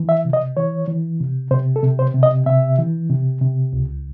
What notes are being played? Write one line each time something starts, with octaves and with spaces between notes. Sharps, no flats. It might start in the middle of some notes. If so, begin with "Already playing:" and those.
Already playing: E3
E5
C3
D#5
E3 C#5
E3
C3
C3 C5
A4
C3
C5
C3
D#5
C3 E5
E3
C3
C3
C#2